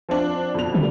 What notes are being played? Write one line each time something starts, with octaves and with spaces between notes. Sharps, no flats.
F3 C4 D4
F2 B2 F7
D3 G3